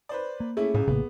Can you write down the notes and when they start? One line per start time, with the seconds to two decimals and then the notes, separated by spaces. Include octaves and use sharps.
0.09 B4 C5 D5
0.40 A#3
0.57 A3 C#4 E4 G#4
0.74 C#2 F#2 A2
0.88 A#1 A2 C#3 A#3 B3